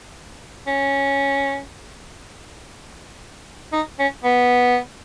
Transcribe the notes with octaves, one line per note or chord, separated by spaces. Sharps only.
C#4
D#4
C#4
B3